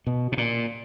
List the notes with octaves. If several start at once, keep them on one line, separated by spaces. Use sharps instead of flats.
B2
B2
A#2